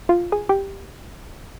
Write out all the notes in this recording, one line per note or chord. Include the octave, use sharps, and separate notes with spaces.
F4
G#4
G4